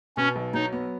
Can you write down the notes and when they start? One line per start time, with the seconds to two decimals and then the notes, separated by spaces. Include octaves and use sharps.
0.17 B2 C#4
0.36 B1
0.54 F#3 D#4
0.73 B3